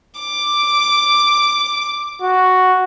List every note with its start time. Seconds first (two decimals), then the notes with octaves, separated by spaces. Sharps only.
0.20 D6
2.22 F#4